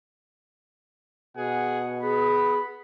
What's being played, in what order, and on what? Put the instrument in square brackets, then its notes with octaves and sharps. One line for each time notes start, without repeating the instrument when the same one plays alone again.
[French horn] B2 [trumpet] G#4 [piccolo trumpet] F#5
[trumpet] B3 [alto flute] G#4 [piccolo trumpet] B5